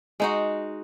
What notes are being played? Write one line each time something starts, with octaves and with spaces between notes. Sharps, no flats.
G#3 D#4 F#4